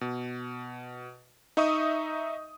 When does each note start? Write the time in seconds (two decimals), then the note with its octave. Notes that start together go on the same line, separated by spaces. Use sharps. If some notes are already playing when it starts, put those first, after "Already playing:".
0.01 B2
1.57 D#4 D#5 E5 C#6 D#6